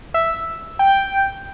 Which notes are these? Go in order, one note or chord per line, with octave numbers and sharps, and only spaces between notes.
E5
G5